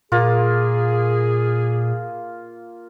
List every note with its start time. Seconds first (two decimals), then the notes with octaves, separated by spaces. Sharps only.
0.12 A#2 A#3 F4 G#4